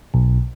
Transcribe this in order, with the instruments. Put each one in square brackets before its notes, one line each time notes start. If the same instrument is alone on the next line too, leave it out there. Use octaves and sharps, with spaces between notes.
[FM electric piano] B1